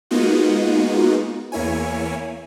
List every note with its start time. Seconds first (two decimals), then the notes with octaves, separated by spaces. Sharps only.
0.11 G#3 A#3 B3 D#4 F4 F#4
1.52 E2 A#3 E4 C#5 G#5